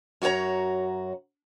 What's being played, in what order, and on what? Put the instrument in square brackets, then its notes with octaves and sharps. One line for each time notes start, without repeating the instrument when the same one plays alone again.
[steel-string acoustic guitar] F#2 F#4 G#4 C#5 A#5